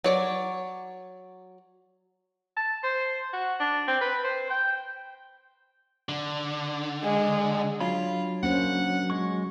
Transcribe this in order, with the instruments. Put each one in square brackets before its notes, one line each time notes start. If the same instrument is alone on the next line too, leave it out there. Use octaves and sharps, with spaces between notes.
[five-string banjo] F#3 C#5 D5
[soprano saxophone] A5
C5
F#4
D4
C4
B4
C5
G5
[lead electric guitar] D3
[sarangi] G#3
[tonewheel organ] F#3 [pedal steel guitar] D4 C#5 B5 [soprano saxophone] F4
[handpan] A#3 C#4 C5 [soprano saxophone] F#5
[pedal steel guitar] G#3 C#6